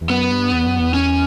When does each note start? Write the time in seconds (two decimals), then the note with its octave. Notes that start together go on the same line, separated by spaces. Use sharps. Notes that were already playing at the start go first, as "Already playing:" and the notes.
0.01 E2
0.10 F#2 B3
0.31 G2
0.52 E2
0.66 F#2
0.80 E2
0.94 C#4